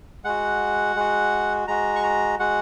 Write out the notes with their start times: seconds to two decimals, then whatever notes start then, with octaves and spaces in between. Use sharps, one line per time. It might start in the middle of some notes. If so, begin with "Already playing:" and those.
0.25 G#3 F#4 F#5
0.96 G#3 F#4
1.68 G#3 F#4 A#5
1.96 C#6
2.03 A#5
2.39 G#3 F#4 F#5